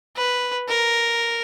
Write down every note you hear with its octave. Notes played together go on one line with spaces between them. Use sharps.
B4
A#4